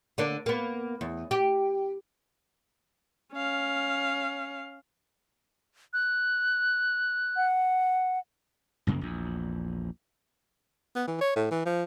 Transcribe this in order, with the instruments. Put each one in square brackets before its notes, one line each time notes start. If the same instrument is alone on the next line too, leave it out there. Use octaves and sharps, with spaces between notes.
[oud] D3 A#3 D4
A#3 B3
E2
G4
[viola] C#4 F5
[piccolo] F#6
[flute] F#5
[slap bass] C2 F#2 C#3 A#3
A#1 E2
[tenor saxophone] B3
E3
C#5
A2
E3
F3